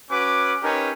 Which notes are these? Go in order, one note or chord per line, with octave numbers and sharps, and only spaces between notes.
C#4 F#4 B4 D6
C#4 D#4 G4 A#4 B4 C#5